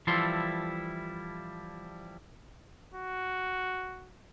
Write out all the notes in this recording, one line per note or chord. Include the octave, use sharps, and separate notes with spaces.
E3 F3 G3 E4 A4 C6
F#4